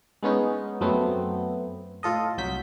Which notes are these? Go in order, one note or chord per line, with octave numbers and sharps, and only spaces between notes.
G#3 B3 C#4 D#4
F#2 F#3 A3 B3 C4
A2 F4 A4 D#5
C2 F#3 G6 B6